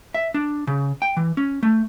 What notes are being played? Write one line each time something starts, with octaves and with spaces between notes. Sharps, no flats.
E5
D4
C#3
G5
E3
C#4
A3